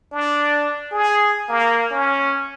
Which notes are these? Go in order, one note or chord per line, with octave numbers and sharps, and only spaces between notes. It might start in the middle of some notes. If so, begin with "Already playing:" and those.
D4
G#4
A#3
C#4